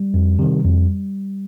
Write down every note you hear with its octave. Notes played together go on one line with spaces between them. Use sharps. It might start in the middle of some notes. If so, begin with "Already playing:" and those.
Already playing: G3
F2
C3 D#3
F2